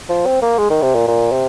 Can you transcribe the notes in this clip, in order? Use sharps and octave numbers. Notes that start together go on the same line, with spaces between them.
F3
C4
A#3
G#3
D#3
C3
A#2
A#2
C3